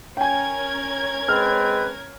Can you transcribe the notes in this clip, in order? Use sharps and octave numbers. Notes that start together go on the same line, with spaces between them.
C#4 A#4 G5 G#5 G#6
G#3 C4 B4 F6